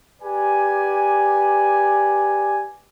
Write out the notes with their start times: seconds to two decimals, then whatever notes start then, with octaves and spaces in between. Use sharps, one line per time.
0.22 G4 B4 D5 G#5